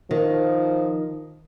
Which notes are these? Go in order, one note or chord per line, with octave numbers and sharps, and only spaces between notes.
D#3 F3